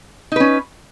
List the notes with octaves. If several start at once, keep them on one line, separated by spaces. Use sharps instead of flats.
C#4 D#4 B4